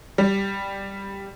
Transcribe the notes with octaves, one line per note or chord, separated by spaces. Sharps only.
G3